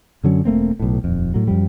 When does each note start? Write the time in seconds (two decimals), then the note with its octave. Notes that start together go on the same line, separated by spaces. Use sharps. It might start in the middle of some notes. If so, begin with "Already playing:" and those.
0.23 F#2 D3 F#3 C#4
0.45 E1 A3 A#3 C4
0.80 B1 A2
1.04 D#1 F2
1.34 A2 F#3
1.48 F#2 F3 G3